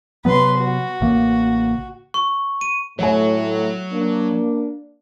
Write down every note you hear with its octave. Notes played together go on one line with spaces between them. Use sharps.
C3 F#3 B3 B4 C6
F#4
A1 C#3 A#3
C#6
D#7
A2 F#3 A3 F#4 C#5 G#5
A#3 D4